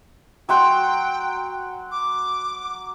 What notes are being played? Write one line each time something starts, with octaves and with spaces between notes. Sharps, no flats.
F#3 F#5 G5 C6
D6